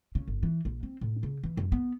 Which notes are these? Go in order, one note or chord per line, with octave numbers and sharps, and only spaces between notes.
C#3
G1
E3
A#1
C4
A2
C#3
E3
F#2
B3